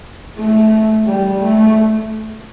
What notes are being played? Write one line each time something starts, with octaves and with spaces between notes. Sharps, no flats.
A3
G3
A3